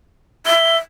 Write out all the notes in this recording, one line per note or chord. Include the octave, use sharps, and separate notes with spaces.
E5 G7